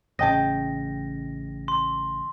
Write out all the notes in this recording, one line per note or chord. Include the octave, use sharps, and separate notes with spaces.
A1 C#3 D#5 G5 A5 A#6
C6